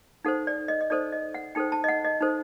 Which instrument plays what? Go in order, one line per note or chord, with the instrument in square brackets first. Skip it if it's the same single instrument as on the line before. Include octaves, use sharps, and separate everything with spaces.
[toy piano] D#4 A4 C5 F#5
D5
D#5
D#5
D#4 A4 C5 D5
D#5
F#5
D#4 A4 C5 G5
A5
D#5
F#5
D#5
D#4 A4 C5